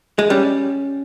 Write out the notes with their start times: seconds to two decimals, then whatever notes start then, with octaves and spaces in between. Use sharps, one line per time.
0.19 G#3
0.30 G3 C#4